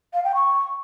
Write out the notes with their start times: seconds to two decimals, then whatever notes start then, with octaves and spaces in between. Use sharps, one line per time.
0.13 F5
0.24 G5
0.35 C#6